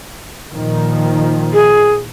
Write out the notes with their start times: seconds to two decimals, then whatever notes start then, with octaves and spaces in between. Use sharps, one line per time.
0.52 A#2 D#3 F3
1.53 G#4